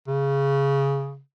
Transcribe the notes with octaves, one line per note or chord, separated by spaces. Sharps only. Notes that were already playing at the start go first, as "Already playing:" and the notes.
C#3